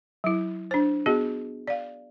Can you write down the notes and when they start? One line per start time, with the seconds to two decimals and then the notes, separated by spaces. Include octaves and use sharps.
0.24 F#3 E4
0.71 D4 C5
1.06 B3 F#4 G#4 D#5
1.68 D5 F5